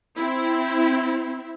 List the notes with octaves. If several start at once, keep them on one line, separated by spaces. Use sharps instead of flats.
C4 E4